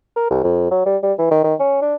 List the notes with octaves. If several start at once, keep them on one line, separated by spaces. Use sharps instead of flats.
A#4
C2
F2
F#3
G3
G3
E3
D#3
D#3
C#4
D4